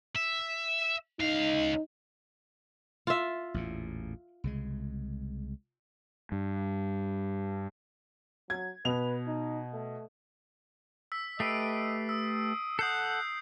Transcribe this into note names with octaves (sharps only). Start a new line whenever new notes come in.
E5
C#2 D#4 F5
F4 E5
A1 E2 A#2
C2 C#3 G#3
G2
F#3 G#6
B2 B4 F7
D#4
A3
E6 B6
A3 G4 B4 D#5 C7 D7
D#6 E6
A4 F#5 D#6 F#6 G6 C7